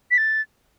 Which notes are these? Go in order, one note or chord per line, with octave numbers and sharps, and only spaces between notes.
B6
A6